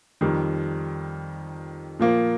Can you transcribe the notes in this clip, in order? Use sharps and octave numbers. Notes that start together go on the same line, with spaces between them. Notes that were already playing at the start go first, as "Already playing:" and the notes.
F2 D#3 G3
A#2 F3 A#3